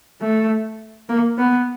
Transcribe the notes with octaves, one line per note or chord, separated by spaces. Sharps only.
A3
A#3
B3